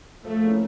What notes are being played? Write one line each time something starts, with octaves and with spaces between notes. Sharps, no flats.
F3 A3
A#3 C#4 E4 G#4